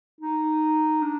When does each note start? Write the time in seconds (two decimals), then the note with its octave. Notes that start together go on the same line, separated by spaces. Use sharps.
0.21 D#4
1.02 D4